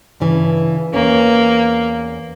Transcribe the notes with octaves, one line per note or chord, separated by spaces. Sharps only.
G2 C#3 E3
E2 G#2 A#3 C#4